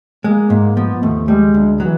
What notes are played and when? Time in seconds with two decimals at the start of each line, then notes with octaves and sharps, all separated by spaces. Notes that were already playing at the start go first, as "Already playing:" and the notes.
0.24 G#3 A#3
0.50 G#2 A#3
0.76 F3 B3
1.02 D#2 A3
1.28 G3 G#3
1.54 D2
1.80 E3 F#3